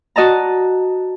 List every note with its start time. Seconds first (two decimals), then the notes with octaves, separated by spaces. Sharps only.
0.16 F#4 D#5 A5 A#5